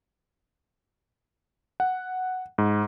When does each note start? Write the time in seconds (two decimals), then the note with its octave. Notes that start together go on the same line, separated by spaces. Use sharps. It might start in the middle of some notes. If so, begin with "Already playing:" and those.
1.80 F#5
2.58 G#2